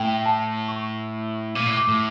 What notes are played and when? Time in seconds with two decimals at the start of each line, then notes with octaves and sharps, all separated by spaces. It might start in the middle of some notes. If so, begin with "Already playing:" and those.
Already playing: A2 G5
0.26 A5
0.68 C#6
1.55 A#2 D6
1.67 A2
1.77 D6
1.88 A2